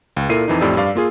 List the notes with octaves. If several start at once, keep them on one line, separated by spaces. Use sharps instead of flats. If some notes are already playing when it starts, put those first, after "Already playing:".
C#2
A#2 E4 A4 A#4 C7 D#7
F2 E3 D#4
F2 A2 F4 G4 D5 E6
G2 D5 F5 C7
A#3 F4 G#4